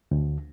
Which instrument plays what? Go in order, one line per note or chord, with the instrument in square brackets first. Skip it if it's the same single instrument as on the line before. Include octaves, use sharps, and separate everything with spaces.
[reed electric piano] D2